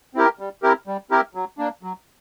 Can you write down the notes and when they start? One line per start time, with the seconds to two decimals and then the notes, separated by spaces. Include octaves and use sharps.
0.14 C4 E4 G4 A#4
0.39 G3
0.63 C4 E4 G4 A#4
0.87 G3
1.10 C4 E4 G4 A#4
1.35 F#3
1.58 A#3 D4
1.83 F#3